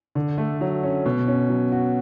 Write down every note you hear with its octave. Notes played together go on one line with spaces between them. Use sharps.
D3
A3
F#3
C#4
B2
C#4
F#3
F#4